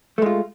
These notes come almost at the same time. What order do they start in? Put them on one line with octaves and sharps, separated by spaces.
A3 G#3 F4